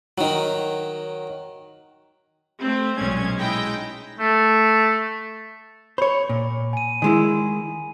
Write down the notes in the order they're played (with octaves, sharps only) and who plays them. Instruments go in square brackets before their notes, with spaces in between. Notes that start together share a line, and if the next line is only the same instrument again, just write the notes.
[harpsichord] D#3 F#3
[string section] A3 C4
B1 A#2 G#3 C#4 G#6
G#3 D#4 E4 D#5 G5
[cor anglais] A3
[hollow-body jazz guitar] C5 C#5 [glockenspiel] B5
[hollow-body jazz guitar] A#2
[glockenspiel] G#5 D#7
[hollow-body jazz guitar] D#3 G#3 E4 [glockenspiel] G#5